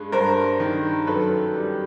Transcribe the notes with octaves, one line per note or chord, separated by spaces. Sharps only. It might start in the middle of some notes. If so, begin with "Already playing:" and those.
Already playing: G2 G#3
G2 A#4 C5
D#3
F#2 A4 B4
G3